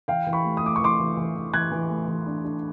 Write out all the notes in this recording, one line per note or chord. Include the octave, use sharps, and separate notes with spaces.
E3 F5 G5
E3
B5 C#6
A3
D#6
A3 D6
C#6
E3 C6 D6
E3
E3
E3
E3 F#6 G#6
E3
A3
E3
D4
D4